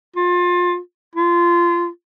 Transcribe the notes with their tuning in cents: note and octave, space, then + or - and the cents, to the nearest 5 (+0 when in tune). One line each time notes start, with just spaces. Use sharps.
F4 +25
F4 -20